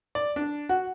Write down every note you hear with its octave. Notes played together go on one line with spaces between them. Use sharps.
D5
D4
F#4